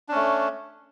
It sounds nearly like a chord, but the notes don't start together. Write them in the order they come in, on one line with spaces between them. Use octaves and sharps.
D4 C#4 A3